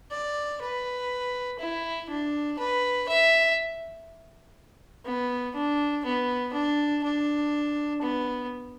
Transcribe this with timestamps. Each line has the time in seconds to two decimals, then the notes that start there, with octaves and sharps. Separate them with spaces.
0.11 D5
0.61 B4
1.59 E4
2.10 D4
2.59 B4
3.08 E5
5.05 B3
5.55 D4
6.05 B3
6.53 D4
7.04 D4
8.02 B3